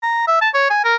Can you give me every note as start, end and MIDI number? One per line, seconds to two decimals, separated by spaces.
0.03 0.24 82
0.27 0.37 76
0.41 0.49 81
0.54 0.69 73
0.70 0.82 80
0.84 0.96 70